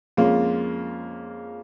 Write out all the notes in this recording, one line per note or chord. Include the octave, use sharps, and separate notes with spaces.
F2 G#3 A#3 C#4 F4